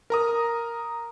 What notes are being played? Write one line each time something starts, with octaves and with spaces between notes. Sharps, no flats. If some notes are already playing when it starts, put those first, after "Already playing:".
A#4 A#5 D#6